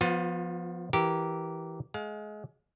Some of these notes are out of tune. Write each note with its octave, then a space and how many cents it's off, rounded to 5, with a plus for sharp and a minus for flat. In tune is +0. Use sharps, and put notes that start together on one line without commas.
F3 +0 B3 +0 F4 +35
E3 -5 G4 -15 A#4 +0
G#3 +30 F5 +30